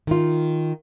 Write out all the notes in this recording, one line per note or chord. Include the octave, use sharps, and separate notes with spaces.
D#3 F4